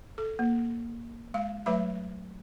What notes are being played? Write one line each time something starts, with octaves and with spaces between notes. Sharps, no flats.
A4
A#3
G#3 F5
F#3 A3 B4 E5 B5